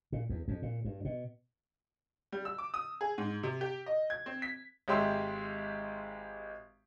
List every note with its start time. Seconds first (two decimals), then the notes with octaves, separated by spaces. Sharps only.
0.12 A#2
0.29 E2
0.48 F2
0.62 A#2
0.85 G2
1.05 B2
2.32 G3
2.45 E6
2.58 D6
2.74 D#6
3.01 G#4
3.18 G#2
3.43 C3
3.61 G4
3.86 D#5
4.10 G#6
4.26 C4
4.42 B6
4.88 G#1 G#3 G4 E5 C6 E6